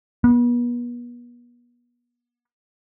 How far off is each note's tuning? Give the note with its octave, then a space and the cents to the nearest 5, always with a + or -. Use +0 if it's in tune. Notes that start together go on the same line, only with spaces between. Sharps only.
B3 -35